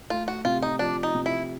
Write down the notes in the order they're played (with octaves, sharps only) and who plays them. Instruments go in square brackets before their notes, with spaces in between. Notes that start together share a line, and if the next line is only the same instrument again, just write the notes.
[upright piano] A3 [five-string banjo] F4
[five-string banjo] F#4
[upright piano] C3 [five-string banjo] F4
[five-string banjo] D#4
[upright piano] F3 [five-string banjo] D4
[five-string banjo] D#4
[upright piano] C3
[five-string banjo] E4